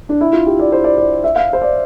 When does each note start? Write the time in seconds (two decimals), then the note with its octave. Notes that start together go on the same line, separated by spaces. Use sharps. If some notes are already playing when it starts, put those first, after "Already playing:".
0.09 D4
0.21 E4
0.33 F4
0.47 G4
0.59 D5
0.72 C5
0.84 D5
0.98 D5
1.24 E5
1.36 F5
1.53 C5
1.62 D5